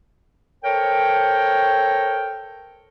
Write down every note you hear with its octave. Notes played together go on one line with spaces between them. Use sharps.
A4 A#4 C5 C#5 G5